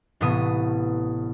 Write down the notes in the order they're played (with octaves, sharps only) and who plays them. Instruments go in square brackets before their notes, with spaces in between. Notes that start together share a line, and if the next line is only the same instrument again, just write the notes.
[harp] A1 A2 C3 B3 D#6